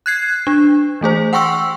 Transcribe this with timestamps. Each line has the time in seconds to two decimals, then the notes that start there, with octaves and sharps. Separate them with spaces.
0.06 F#6 G#6 C7
0.47 D4
1.01 E3 A3 G#4 C5
1.33 F#5 G5 C6 C#6 E6